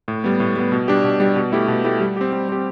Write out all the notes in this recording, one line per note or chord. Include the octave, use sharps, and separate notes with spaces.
A2
G3 B3
A2
G3 B3
B2
G3 D4 G4
B2
G3 D4 G4
B2
A3 E4 G4
B2
A3 E4 G4
G3
C4 G4
G3
C4 G4